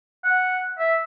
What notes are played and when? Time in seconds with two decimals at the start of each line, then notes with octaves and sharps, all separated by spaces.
0.24 F#5
0.79 E5